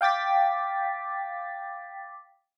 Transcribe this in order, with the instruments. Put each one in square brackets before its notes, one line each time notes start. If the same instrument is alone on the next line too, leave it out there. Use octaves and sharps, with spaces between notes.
[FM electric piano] F5 G5 D6 A6 B6